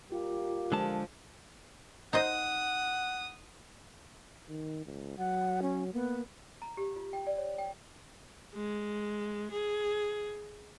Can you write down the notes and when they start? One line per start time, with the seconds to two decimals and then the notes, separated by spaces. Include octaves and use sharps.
0.12 G3 A#3 F4 G4
0.72 D3 F3 G#3 A5
2.13 D#4 C5 D#5 F#5 D#6
4.49 D#3
4.86 C#2
5.18 F#3 F#5
5.62 C#4
5.93 A#3 B3
6.62 A#5
6.77 G4
6.96 F4
7.13 G5
7.27 D5
7.38 C#5
7.58 G5
8.55 G#3
9.51 G#4